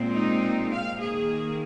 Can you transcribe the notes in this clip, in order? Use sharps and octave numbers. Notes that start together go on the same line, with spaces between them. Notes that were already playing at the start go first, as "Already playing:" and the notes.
Already playing: A#2 G#3 C4
D#4
F5
D#3 A#3 G#4